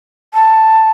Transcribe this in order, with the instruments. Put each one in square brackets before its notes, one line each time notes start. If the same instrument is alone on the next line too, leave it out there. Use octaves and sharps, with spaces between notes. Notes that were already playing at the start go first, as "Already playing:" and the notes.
[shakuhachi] A5